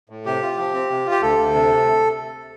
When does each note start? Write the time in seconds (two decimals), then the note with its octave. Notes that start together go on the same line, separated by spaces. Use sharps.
0.10 A2
0.26 C3 G4
0.42 F4
0.58 F3
0.74 C4
0.90 C3
1.06 F4 G4
1.21 D2 A4
1.38 D2
1.54 C3